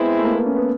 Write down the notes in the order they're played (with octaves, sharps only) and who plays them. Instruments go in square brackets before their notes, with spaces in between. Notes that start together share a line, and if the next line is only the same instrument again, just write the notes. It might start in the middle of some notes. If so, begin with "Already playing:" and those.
Already playing: [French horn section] G#3 C4 E4 [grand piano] B3
[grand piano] A3
A#3
B3
C#4
B3